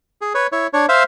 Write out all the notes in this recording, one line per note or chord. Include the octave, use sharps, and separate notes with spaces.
G#4
B4 C#5
E4 C#5
D4 C#5
C5 E5 F5